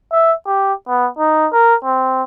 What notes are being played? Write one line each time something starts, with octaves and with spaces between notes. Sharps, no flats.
E5
G4
B3
D#4
A#4
C4